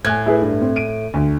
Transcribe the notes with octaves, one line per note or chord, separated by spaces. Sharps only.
A2 G#5 F#6 G#6
E4 G#4 B4
G2
C4
D7 D#7
D2